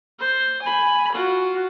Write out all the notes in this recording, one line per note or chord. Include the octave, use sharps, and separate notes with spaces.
C5
G#5 B5
F4 F#4